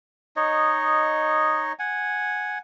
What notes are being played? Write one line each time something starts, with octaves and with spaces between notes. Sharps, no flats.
D#4 C#5 D#5
F#5 G#5